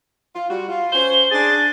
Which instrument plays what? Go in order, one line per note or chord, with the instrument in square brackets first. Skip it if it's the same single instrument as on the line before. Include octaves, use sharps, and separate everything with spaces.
[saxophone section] F4
G3 F#4
F4
[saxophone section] C#4 C5 [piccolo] G7
[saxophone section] D4 G#4 [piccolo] A6